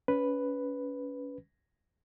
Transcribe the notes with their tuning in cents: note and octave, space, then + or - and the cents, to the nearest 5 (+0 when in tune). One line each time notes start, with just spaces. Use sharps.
C#4 +25 B4 +0